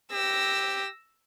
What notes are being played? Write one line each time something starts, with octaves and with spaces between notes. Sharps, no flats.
G4 E6 A#6